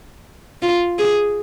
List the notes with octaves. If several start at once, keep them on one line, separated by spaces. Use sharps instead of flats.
F4
G#4